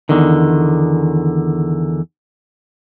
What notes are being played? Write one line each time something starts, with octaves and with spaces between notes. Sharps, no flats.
E2 D3 D#3